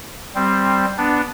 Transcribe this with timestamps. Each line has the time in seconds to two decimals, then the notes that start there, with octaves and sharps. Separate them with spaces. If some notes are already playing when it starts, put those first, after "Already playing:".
0.35 G3 C4
0.98 B3 D4